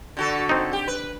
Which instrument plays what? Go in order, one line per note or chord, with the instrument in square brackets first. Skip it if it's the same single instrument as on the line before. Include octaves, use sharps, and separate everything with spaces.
[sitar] D3 F#4 A4
[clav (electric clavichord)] C4 D#4
[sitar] G4
B4